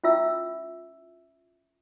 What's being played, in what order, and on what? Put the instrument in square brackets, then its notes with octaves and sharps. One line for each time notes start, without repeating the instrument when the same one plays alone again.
[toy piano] C#4 E4 F4 E5 E6